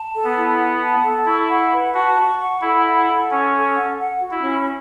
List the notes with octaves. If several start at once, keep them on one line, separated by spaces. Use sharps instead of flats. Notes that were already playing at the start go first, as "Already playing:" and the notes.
Already playing: A5
A4
B3
E4
F#5
A5
A4
E4 C#6
F#5
B4
F#4 A5
C#6
F#5
E4 A4
F#5
A4
C#4 C#6
A4
F#5
F#5
F#4
E4
C#4